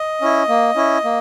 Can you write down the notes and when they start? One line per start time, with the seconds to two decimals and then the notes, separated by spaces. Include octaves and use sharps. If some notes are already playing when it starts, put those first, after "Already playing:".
Already playing: D#5
0.21 C#4 E4
0.49 A#3
0.76 C#4 E4
1.04 A#3